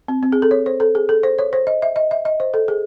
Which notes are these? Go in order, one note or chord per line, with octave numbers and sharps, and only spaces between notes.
C4
C4
G#4
A4
C#5
C5
A4
G#4
A4
C5
C#5
C5
D#5
E5
D#5
E5
D#5
C5
A4
G#4